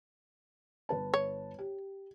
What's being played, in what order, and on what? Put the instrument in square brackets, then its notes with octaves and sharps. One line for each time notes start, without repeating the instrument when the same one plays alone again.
[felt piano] G1 B4 A5
[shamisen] C#5
[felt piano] G4